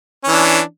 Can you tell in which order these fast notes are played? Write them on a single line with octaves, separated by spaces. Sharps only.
C#4 E3 D4